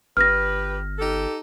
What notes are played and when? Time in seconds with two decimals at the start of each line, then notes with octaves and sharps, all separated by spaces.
0.17 G1 G4 B4 F6 A#6
0.98 D#4 G4 A4